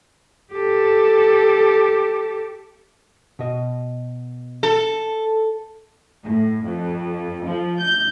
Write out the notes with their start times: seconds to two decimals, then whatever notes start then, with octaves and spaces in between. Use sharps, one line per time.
0.53 G4 A4
3.39 B2 D#5
4.63 A4
6.22 A2
6.64 F2
7.45 F3
7.78 G6